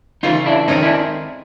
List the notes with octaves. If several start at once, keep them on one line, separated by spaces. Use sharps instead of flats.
C#3 E3 A3 D#4 F4
D4 E4
D#3 G#3 C4 C#4 D#4 F4 G#4
D4 E4